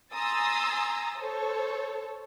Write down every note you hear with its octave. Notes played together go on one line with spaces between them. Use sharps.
G#5 A#5 C6 D#6 E6 A6
A4 C5 C#5